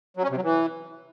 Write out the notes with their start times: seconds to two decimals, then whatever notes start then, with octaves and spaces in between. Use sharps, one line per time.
0.17 F#3
0.23 C#4
0.30 C3
0.37 F#3
0.43 E3